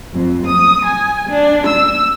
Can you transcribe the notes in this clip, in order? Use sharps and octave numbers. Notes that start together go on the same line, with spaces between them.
F2
D#6
G#5
D4
E6